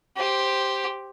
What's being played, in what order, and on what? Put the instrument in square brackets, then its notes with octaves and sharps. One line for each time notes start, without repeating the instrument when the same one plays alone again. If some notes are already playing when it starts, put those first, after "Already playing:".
[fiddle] G4 C5